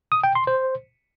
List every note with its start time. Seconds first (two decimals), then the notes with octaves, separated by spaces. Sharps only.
0.12 D#6
0.24 G5
0.35 C6
0.47 C5